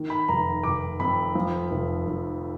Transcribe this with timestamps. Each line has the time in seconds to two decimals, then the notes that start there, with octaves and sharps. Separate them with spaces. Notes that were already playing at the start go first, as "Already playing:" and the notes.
Already playing: D#3
0.10 B5
0.28 F1 A#5
0.63 F1 D6
1.00 F2 B5
1.35 F3
1.71 F1
2.06 F1